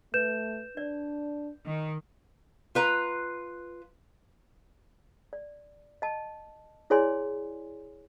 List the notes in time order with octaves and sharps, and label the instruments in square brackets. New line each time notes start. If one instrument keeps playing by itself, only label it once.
[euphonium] A3 [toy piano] B4 [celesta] G6 E7
[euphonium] D4 [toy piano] D5
[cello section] D#3
[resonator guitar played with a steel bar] F4 B4 A#5
[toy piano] D5
D#5 A5
E4 G#4 C#5 D5 G#5 C6